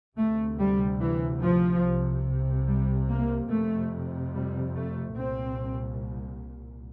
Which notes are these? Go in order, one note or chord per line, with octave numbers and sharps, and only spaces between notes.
D2 C3 A3
G3
E3
F3
C2 C3
G3
A#3
F2 C3 A3
G3
A3
C2 A#2 C4